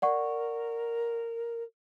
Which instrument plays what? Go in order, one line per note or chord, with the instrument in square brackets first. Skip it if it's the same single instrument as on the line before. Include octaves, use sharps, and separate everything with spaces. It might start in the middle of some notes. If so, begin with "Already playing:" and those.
[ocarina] A#4 [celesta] D5 F#5 C#6